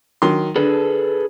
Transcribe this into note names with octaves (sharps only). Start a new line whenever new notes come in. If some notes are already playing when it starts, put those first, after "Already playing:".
D#3 F#3 C6
D3 G#4 A4 B4